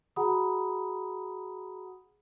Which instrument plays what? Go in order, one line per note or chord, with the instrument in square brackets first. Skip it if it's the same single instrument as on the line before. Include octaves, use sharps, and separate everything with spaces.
[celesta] F#4 G#4 F#5 A#5 B5 D#6